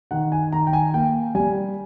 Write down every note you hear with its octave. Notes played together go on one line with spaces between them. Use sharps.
D#3 F#5
G#5
D#3 A#5
G5
G#5
A#3 G5
G3 G#5